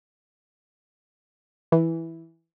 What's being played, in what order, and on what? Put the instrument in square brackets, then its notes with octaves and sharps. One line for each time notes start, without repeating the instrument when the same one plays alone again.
[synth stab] E3